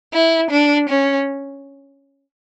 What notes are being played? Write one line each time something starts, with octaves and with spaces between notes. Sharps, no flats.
E4
D4
C#4